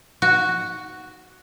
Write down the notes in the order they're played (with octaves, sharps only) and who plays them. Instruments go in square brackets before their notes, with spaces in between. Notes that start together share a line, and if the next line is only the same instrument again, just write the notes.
[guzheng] F#4